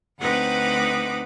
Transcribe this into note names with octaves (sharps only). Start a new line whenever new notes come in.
D2 C4 D#4 B4 F#5 D6